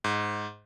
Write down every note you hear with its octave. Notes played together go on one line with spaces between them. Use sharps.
G#2